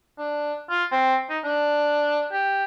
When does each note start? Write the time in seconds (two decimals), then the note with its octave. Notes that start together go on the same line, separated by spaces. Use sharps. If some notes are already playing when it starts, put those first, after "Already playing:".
0.18 D4
0.70 F4
0.92 C4
1.30 D#4
1.44 D4
2.32 G4